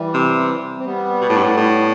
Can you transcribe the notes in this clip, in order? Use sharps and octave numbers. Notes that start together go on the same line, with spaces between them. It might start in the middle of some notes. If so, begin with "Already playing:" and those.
Already playing: E3 G3
C3
C4
G3 B3
B2
A2
G2
A2
A2